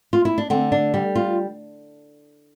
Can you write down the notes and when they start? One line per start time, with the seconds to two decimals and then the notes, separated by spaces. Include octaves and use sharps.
0.13 F4
0.25 E4
0.38 D4
0.50 D3 C4
0.72 D4
0.94 G3
1.15 F4